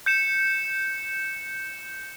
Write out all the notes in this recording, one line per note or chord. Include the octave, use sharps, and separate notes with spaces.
G6 C#7 E7